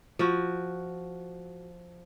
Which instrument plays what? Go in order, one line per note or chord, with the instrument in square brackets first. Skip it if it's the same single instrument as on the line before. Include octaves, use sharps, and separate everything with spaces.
[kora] F3 F#4